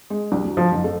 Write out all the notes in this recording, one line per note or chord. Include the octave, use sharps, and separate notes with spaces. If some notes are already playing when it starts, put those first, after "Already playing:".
G#3
C2
D2
F3
F#1
A3